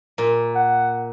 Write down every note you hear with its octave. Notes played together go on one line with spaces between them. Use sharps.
A#2
F#5